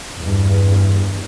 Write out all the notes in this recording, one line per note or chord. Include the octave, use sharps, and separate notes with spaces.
E2 G2